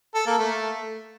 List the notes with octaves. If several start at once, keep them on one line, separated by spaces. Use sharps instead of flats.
A4
A#3
A3